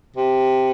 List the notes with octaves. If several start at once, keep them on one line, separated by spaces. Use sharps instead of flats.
C3